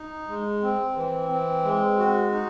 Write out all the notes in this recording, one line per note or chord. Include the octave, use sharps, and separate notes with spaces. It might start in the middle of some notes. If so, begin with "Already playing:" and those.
Already playing: D#4
G#3
C4
E3
C4
G#3
F#4
D#4